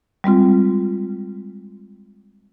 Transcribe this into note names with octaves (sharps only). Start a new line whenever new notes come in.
G3 G#3 C4 F4